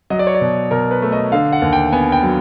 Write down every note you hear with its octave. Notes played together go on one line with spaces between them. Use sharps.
F#3 D#5
D5
C#5
D5
B2
B2 A#4
B4
A3
D#5
D3 F5
F#5
D#2
G5
B3 G#5
G5
F#3